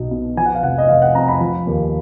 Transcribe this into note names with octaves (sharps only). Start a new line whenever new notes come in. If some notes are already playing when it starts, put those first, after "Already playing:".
Already playing: B1 D#4
B2
F3 G#5
F#5
F5
F1 F#5
D#5
F1 F5
F#5
F2 A#5
B5
F3
D#2